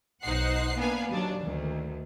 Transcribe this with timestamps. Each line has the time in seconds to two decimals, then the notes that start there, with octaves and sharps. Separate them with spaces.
0.23 B1 D#4 C5 F#5 F#6 C7
0.77 A#3 B3 D4 B4 F5 G#5
1.11 D#2 F#3 D4
1.41 D2 D#3